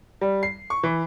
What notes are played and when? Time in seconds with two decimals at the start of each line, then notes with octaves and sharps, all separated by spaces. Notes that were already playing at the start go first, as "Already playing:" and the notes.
0.21 G3
0.43 C7
0.70 C#6
0.83 E3